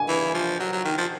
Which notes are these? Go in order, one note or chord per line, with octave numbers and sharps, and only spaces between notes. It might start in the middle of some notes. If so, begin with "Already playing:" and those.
Already playing: G#5
E3
F3
F#3
F#3
D#3
F3